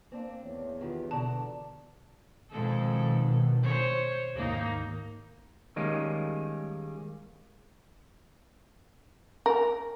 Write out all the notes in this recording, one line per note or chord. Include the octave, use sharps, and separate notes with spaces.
A#3 C4 D4
E2 C#5
D#3 B3 F4 G4
B2 D3 D5 A5 A#5
F2 B2 D#3 G#3 A4
C5 C#5
D#2 G#2 D#3 A#3 D#4
D#3 G3 G#3 A#3 C#4
A#4